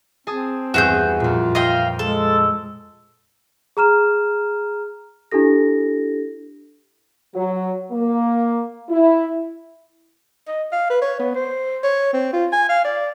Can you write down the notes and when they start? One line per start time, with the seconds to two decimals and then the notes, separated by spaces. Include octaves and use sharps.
0.27 C4 G#4 A5 D#6
0.74 E2 G2 F#4 G#4 G6
1.20 F2 A#2 F4
1.55 D#5 F5 G5 C6
1.99 G#3 A4
3.77 G#4 A#5 F6 E7
5.31 D4 E4 G4 A4 A#6
7.35 F#3
7.92 A#3
8.89 E4
10.48 D#5
10.72 F5
10.90 B4
11.02 C#5
11.20 B3
11.35 C5
11.83 C#5
12.13 C4
12.33 F4
12.52 G#5
12.69 F5
12.84 D5